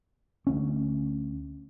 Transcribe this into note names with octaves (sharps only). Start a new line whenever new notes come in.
D2 C#4